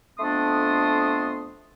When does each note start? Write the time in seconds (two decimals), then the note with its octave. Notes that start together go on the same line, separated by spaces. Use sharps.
0.19 F2 A3 B3 D4 C6 D#6